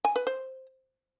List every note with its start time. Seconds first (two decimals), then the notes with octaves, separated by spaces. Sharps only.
0.05 G#5
0.16 B4
0.27 C5